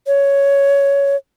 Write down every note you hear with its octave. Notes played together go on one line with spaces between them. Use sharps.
C#5